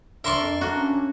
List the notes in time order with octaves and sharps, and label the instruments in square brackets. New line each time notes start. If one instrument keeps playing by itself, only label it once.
[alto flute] D4 [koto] A#4 D5 [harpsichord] E5 C6 C#6
[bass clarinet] F2
[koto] A#3 F#4 [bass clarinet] D4 [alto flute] A#5
[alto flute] C#4